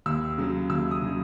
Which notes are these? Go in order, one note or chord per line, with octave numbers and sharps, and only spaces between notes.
D#2 E6
C#3 F#3
D#2 E6
D#6
C#3 F#3